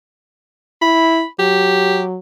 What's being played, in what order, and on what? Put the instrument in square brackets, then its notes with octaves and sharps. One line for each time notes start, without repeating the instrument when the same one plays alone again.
[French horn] E4 [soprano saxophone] B5
[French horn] F#3 [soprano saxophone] G4